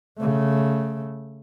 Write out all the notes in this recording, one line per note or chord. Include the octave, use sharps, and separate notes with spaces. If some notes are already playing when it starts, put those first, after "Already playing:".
C#3 A3